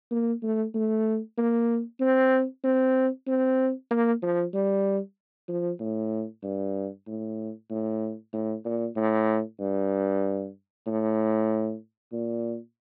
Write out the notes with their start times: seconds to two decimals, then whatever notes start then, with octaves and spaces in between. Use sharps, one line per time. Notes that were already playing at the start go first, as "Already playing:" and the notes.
0.11 A#3
0.42 A3
0.75 A3
1.38 A#3
2.01 C4
2.64 C4
3.27 C4
3.91 A#3
4.22 F3
4.54 G3
5.49 F3
5.80 A2
6.43 G2
7.07 A2
7.70 A2
8.33 A2
8.65 A#2
8.96 A2
9.60 G2
10.87 A2
12.13 A#2